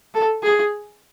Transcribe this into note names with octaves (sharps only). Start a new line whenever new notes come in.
A4
G#4